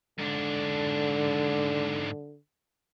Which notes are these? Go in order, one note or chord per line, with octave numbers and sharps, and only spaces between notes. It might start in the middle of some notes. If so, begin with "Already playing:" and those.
G#2 D3 D4